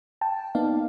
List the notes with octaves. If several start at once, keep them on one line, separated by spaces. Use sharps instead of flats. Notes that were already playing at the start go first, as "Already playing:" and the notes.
G5 A5
A#3 B3 D#4 D5 F5